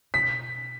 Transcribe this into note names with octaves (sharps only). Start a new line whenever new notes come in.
B2 B6